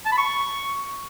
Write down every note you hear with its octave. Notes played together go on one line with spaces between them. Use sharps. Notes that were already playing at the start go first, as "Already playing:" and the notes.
A5
B5
C#6